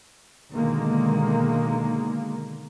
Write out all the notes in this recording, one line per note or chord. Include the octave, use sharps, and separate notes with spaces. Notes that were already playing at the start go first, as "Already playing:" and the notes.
B2 D3 D#3 G#3 A#3